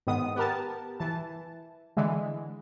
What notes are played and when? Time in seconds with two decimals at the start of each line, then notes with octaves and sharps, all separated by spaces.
0.07 G#2 D#3 B3 D#6
0.36 B3 G4 A#4 A5
1.00 E3 A5
1.97 D3 E3 G#3